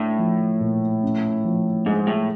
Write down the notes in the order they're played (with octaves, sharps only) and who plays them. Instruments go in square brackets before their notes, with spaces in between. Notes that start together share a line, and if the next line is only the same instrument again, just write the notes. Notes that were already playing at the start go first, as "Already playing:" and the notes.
Already playing: [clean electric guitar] A2 [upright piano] D4
[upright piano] F3
A#2
C#4
F3
[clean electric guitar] G#2 [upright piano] G#3
[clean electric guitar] A2